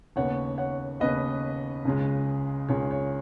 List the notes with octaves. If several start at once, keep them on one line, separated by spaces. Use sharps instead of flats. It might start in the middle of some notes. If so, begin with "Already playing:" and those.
D#2 C#3 B3 C#5 F#5
C#5 F#5
D#2 C#3 B3 B4 D#5
C#2 C#3 G#3
C#2 C#3 G#3 C#5
C#5